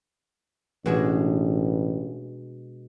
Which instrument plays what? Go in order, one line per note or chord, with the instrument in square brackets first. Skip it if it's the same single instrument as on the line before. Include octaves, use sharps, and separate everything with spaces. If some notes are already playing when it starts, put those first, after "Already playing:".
[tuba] A1 [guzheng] B2 G#3 D4